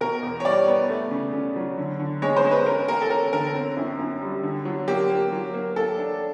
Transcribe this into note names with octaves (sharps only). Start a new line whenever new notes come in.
B2 A#4
E2
C#5
G3 D5
B3
A3
C#3
C#3
F#3
D3
D3
G#3 C#5
C5
G#3
B4
C#4 A#4
A#3 A#4
A4
C#4 A#4
D3 A#4
C4
F#2
F#2
G3
D3
F#3
A#3 G4
A#3
F#3
A#3
A#3 A4
D4